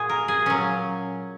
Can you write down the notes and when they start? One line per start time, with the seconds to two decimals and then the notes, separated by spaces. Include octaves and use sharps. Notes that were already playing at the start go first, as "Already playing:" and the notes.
Already playing: A#2 G#3 F#4 G#4
0.09 A#4
0.28 G#4
0.46 A#2 F#3 C#4